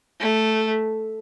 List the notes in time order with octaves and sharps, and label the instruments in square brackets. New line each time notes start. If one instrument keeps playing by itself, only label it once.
[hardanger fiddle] A3